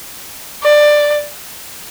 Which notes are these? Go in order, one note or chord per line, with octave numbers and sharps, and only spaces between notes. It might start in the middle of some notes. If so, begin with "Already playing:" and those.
D5